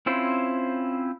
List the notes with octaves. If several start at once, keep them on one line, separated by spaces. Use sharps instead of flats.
C4 C#4 E4 F4 C5